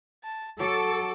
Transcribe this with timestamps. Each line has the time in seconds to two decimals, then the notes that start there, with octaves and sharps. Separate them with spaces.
0.24 A5
0.60 F#3 A4 D6